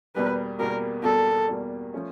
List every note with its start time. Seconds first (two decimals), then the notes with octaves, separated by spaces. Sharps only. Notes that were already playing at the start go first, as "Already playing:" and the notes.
0.15 E2 B2 G3 A#3 B4
0.59 E2 B2 G3 A#3 A#4
1.03 E2 B2 G3 A#3 A4
1.48 E2 B2 G3 A#3
1.94 F3 A3 C#4